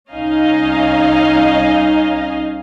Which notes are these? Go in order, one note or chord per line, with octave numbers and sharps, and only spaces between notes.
C2 C#4 D#4 D#5 F5 G#5